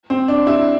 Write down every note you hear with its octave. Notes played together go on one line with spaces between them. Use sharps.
C4
D4
E4